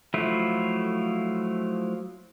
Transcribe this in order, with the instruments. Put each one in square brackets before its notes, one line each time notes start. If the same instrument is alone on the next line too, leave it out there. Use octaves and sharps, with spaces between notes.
[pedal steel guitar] F3 F#3 A3 E4 F4